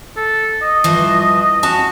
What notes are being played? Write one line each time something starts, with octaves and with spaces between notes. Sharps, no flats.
A4
D#5
G2 E3 F3
C#4 F#4 A5